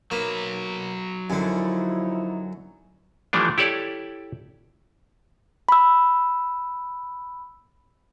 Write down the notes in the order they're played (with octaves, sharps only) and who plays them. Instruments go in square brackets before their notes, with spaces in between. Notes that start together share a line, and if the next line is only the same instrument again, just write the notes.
[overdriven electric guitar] F#3 B4 [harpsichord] A#3
[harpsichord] F#2 D3 [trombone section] F3 D#4 E4
[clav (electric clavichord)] E3 F3 G3 A3 D4
E4 G4 A4 C#5 D5
[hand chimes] B5 E6